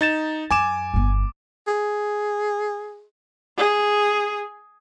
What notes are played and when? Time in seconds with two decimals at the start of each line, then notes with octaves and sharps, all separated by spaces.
0.01 D#4 A6 E7
0.50 F#2 G#5 D6 E7
0.94 G1 B3
1.67 G#4
3.57 G#4